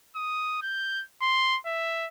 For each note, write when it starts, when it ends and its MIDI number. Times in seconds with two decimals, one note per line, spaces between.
0.16 0.60 87
0.63 1.04 91
1.22 1.58 84
1.66 2.07 76